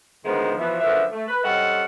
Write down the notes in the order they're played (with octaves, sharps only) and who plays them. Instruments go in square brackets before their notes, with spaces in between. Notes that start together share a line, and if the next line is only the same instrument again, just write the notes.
[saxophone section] D2 D#3 F3 G#3 B3 C5
B2 E3 F3
F#2 D3 F3 D4 B4 E5
A3
B4
G3 C4 C#4 A4 D#5 F#5